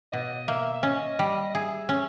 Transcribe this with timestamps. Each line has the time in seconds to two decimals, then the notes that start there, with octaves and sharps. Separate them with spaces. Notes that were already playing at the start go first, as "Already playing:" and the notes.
0.12 B2 D#5
0.48 A#3 E5
0.74 E5
0.83 C#4 D#5
1.19 G3
1.50 D#5
1.54 G#4 E5
1.89 C#4